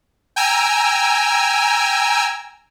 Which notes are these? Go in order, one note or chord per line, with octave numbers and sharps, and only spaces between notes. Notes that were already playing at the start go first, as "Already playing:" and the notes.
G5 G#5 A#5 E6